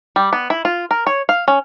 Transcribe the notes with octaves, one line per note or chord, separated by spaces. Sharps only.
G3
B3
E4
F4
A#4
C#5
F5
C#4